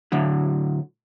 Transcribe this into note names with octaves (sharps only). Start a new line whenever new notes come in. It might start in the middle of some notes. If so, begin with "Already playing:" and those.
D2 A2 D3 F#3